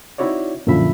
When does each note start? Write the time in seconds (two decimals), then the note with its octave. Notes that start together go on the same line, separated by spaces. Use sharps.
0.18 C4 D#4 E4 F#4 C#5 D5
0.67 F#2 A#2 D3 F3 E5 B5